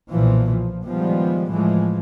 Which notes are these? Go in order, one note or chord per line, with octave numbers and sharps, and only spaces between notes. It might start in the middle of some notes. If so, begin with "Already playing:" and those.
B1 A#2 E3 F3
F3
D#3 F3 G3 G#3 B3
A2 E3 F3 G#3